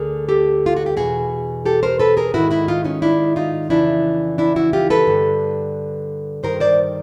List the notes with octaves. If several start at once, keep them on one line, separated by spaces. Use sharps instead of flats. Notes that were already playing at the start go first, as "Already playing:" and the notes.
Already playing: D2 D3 G#4 A#4
G4 A4
F4
F#4
G4
E2 B2 F#4 G#4
G4 A4
A#4 C5
A4 B4
G#4 A#4
G#2 D#3 E4 F#4
E4 F#4
D#4 F4
C#4 D#4
D4 E4
D#4 F4
F2 C#3 E3 D4 E4
D4 E4
E4 F#4
F4 G4
A4 B4
G2 D3
G2 D#3 A#4 C5
C5 D5